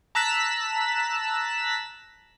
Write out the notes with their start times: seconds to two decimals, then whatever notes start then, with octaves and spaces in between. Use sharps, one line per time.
0.15 A5 A#5 E6 F#6 B6 E7